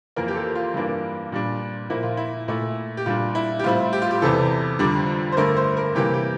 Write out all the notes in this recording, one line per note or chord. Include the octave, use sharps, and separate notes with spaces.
F2 E3 A#3 A#4
G4
A4
F4
G2 E3 A#3 D4
A#2 G3 D4
A#2 F3 A#3 E4
F4
E4
A#2 A3 E4
G4
A#2 G3 D4 F4
E4
G4
A2 G3 C4 E4 F4
G4
F4
G4
E2 C3 E3 A4
F2 D3 G3 D4
C5
G2 D3 A3 A#4
C5
A#4
C3 E3 G3 A#3 G4
G4